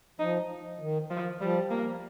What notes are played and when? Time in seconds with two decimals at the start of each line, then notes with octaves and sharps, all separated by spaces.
0.19 F3 D#4
0.80 D#3
1.11 F3
1.41 F3 G3
1.71 A#3